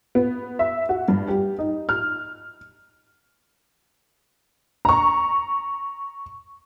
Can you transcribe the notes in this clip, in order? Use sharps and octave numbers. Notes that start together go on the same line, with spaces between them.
B3
E5
F#4
G2
G4
D#4
F6
A#5 C#6